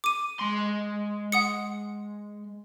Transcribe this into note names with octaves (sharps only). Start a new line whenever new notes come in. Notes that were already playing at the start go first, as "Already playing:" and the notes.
D6 D#7
G#3 C6
F#5 D#6 C#7